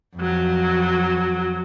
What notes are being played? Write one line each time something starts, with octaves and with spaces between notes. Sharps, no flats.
F2 F#3